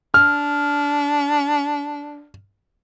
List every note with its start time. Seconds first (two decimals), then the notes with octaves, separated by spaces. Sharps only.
0.14 D4 F6